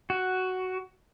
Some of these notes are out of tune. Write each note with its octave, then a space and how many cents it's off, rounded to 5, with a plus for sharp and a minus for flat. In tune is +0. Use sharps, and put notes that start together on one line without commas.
F#4 +5